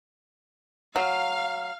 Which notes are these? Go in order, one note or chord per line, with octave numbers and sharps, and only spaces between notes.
F#3 F5